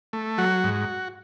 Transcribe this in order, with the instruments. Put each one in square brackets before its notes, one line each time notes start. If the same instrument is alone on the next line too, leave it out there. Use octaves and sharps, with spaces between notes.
[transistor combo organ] A3
F#3 F#4
G#2